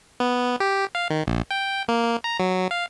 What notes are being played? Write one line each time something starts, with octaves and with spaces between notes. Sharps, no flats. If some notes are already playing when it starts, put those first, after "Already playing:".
B3
G4
F5
D#3
A#1
G5
A#3
A#3
A#5
F#3
F5